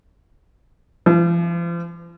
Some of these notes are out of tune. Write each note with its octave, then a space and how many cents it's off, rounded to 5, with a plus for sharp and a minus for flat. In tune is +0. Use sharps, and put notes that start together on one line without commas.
F3 -40